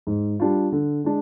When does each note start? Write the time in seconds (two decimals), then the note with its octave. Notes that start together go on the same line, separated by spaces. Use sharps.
0.07 G#2
0.40 G3 D4 F4
0.72 D3
1.04 G#3 D4